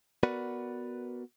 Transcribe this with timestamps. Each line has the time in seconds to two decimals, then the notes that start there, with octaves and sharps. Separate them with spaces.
0.23 B3 F#4 A#4 B4 D5 F#5